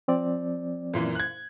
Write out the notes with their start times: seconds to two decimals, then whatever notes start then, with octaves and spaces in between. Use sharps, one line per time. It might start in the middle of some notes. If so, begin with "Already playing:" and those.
0.08 F3 C4 D5
0.94 F#2 A#2 E3
1.15 F#6 G#6